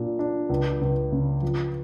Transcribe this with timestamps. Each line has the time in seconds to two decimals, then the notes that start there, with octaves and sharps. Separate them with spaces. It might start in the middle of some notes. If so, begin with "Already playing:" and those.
Already playing: A#2 D4
0.19 D4
0.49 C#2
0.81 C#2
1.12 C#3
1.42 F3